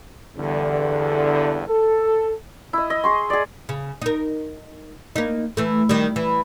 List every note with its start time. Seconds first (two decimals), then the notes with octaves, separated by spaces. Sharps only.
0.38 E2 G2 D3
1.68 A4
2.73 E4 D#5
2.90 D#5
3.04 G#4 C6 C#6
3.30 G#4 D5
3.69 C#3
4.02 D#4 A#4
5.16 A#3 D#4
5.57 E3 A3
5.89 D#3 G3
6.16 E3